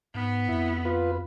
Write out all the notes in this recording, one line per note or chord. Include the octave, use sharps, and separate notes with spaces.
G#2 B3
F2 E4
F4 B4